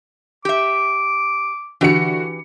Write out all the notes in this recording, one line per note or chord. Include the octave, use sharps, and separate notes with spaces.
G4 E5 D6
D3 E3 F#4 G4 C#7